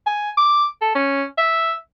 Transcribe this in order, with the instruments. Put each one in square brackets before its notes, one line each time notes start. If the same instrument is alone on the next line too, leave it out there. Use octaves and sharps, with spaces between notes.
[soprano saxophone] G#5
D6
A4
C#4
E5